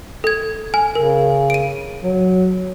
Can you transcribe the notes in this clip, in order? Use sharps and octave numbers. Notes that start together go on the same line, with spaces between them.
A4 G#6
G#5
C#3 A#4
D7 D#7
F#3